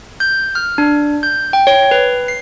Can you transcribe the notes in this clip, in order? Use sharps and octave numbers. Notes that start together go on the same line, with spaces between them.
G6
F6
D4
G6
G5
C#5
B4
C7